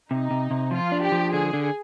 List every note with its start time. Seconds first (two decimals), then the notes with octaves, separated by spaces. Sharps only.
0.10 C3 D#4
0.31 C3
0.51 C3
0.71 F3 F4
0.92 D4
1.02 G4
1.12 F3
1.32 D3 G#4
1.53 D3